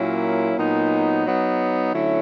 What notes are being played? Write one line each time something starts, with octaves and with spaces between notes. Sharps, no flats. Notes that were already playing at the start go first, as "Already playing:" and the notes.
Already playing: A#2 F#3 A#3 C#4 E4
A#2 F#3 B3 D#4
F#3 B3 D#4
D3 F#3 A3 C#4 E4